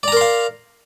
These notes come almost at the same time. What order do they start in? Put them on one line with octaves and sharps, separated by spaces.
D5 A#5 A#4 C6 F5